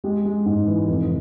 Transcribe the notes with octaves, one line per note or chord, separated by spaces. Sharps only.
G#3 G4
G#3
G#2
E3
F1